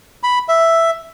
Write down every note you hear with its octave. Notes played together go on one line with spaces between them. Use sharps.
B5
E5